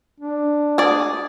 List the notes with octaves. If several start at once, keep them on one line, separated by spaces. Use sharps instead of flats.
D4
G#4 D5